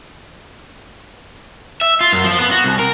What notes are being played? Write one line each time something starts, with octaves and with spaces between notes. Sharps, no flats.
E5
F4
F#2
F3
B3
F#4
C2
A#4